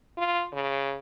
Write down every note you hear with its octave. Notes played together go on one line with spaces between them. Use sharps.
F4
C#3